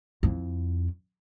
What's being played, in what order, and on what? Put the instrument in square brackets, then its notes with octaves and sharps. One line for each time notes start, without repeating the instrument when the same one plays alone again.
[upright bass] F2 E4